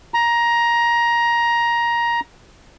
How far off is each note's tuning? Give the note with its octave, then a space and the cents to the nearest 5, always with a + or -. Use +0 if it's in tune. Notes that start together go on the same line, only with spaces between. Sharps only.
A#5 +15